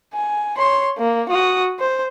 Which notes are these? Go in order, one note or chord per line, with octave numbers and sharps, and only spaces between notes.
G#5
C#5 C6
A#3
F#4 D#6
C5